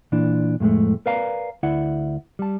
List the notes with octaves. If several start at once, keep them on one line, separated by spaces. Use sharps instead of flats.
A#2 E3 D4
F2 A2 F3 G#3 A3
A#4 B4 D5 F5 G#5 A#5
D2 E4 D5 E5 F#5
G3 A5